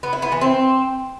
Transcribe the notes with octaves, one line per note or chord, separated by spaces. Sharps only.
B3
E4
B3
E3
C4